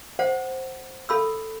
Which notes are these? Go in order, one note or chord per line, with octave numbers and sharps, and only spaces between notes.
C5 F#5
A4 B5 E6